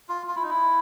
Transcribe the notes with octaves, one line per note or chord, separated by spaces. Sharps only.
F4
F4
E4
D#4
E4